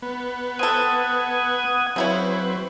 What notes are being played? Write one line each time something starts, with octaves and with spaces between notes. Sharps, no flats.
B3
C4 A4 F#5 D#6 G#6
C#3 F#3 C4 E4 B4 C#5